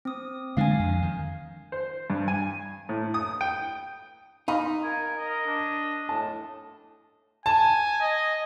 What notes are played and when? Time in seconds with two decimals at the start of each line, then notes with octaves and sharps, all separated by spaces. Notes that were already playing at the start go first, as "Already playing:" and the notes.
0.05 C4 D#6
0.57 D3 G#3 D4 F5 G#5
0.79 F2
1.02 D#3
1.72 C5
2.10 G2
2.28 G#5
2.89 A2
3.14 D#6
3.41 G5
4.48 D#4 F5 B5
4.84 A#4 G#5
5.18 D#5
5.46 D4
6.09 A2 A5
7.46 G#5 A5
8.01 D#5